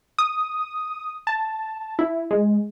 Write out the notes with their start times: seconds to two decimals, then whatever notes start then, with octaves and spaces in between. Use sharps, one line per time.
0.19 D#6
1.27 A5
1.99 E4
2.31 G#3